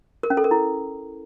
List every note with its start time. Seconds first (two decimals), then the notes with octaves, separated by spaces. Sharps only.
0.23 A#4
0.30 C#4
0.37 A4
0.44 A#4
0.51 E4